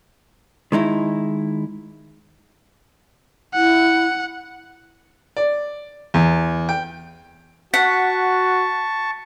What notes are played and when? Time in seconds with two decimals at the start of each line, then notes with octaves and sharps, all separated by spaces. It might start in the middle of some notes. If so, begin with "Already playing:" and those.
0.72 D#3 G#3 D#4 E4
3.55 E4 F#5
5.37 D5
6.14 E2
6.69 G5
7.74 F#4 F#5 A5 C#6 B6